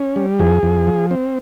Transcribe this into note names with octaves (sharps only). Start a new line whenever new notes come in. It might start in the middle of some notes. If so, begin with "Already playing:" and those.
Already playing: C#4
G3
F2 G#4
F2
F3
C4